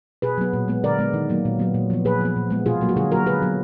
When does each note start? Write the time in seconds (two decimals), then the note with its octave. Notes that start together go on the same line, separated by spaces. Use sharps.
0.22 B2 G#4 B4
0.38 F#3 B3
0.53 A#2
0.68 G#3 B3
0.84 D3 A#4 D5
0.99 G#3 B3
1.14 D#3
1.29 F#3 A#3
1.45 A#2
1.59 F#3 B3
1.74 A#2
1.90 F3 B3
2.05 A#2 G#4 B4
2.21 F3 B3
2.36 A#2
2.50 G#3 B3
2.66 B2 F4 G#4
2.81 F#3 A#3
2.89 F#4
2.96 D3 F4 G#4
3.11 F#3 A#3 F#4 A#4
3.26 D3 G#4 B4
3.42 F#3 B3